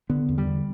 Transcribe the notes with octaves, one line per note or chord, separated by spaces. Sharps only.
D3 B3
E2
G3
D3